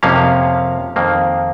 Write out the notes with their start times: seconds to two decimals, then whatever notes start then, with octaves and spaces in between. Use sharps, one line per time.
0.03 F2 C3 F3 A#3 C#4 F5
0.96 F2 D#3 A#3